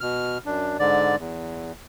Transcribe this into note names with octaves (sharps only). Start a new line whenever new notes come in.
B2 F6
F#2 D4
G#2 D3 D5
E2